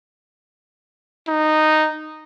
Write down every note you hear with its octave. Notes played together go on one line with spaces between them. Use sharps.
D#4